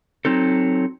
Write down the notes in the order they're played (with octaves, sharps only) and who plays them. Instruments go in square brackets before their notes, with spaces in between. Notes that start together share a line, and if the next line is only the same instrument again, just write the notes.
[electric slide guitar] F#3 C4 D#4 A4